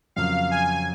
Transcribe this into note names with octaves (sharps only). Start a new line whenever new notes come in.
F2 C#3 F#3 A#3 F5
G#5